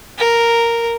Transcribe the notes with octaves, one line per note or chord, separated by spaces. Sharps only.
A#4